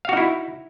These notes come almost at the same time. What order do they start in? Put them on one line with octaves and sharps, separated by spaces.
F5 F#4 D#4 E4